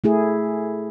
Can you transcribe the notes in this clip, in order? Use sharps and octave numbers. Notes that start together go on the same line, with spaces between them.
A3 E4 G#4